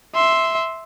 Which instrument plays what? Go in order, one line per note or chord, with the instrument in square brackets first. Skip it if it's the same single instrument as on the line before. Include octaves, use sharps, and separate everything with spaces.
[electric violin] E5 C6